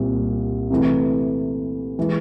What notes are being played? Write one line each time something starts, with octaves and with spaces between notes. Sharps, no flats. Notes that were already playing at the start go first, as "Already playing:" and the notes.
Already playing: C2 A#2 G3 C4
C3 E3 A3
E3 G#3